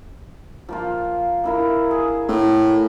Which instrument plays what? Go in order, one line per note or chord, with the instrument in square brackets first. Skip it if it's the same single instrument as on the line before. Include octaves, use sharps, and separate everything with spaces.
[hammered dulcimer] F3 A#3 F4
A#3 E4 A#4
G#4
[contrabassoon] A2